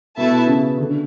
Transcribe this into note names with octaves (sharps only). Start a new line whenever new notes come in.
B2 A3 E4 B4 E5 A5
C#3
D3